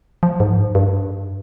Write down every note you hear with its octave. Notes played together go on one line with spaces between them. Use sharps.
F3
G#2
G2
G2